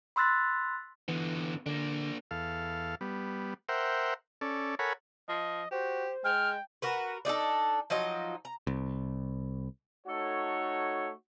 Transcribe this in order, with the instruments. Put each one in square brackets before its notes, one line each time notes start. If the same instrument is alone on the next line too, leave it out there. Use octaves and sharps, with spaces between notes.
[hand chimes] B5 C6 E6 F#6 A6 B6
[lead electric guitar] D3 B3 [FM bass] E3
[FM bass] D3 [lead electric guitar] A#3 D4
[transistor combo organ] E2 A4 F5
G3 B3
A#4 C5 E5 F#5 G5
C#4 A4 D5
A4 A#4 C#5 F#5 G#5 B5
[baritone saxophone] F3 [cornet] D#5
[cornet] F#4 [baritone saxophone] G4 [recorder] C5
[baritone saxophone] G#3 [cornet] G5 [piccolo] F6
[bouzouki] F#4 A#4 B4
D4 D#4 G#4 A4
F3 F#3 D#4 D#5
A#5
[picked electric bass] C2
[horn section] A3 D#4 F#4 A4 C#5